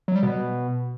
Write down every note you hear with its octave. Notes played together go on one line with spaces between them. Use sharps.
F#3
G3
B2